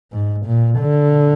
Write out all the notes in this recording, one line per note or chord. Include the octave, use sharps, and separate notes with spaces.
G#2
A#2
D3